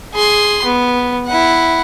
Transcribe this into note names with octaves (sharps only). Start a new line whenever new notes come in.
G#4 C6
B3
E4 F#5